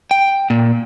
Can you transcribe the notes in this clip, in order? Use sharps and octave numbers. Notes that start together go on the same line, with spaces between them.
G5
A#2